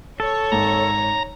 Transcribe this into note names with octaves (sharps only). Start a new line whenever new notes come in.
A4 C#5
G#1 A#5